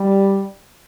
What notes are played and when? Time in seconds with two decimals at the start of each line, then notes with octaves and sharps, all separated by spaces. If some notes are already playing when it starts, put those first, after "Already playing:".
Already playing: G3